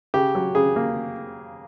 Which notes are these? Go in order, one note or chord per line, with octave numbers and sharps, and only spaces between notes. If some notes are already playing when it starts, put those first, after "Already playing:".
C#3 G4
F#3
C#3 G#4
A#3